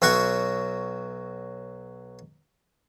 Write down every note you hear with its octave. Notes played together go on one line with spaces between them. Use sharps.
B1 F#3 F#4 C#6